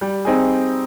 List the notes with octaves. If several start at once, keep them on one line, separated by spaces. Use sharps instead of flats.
G3
C4 D#4 G#4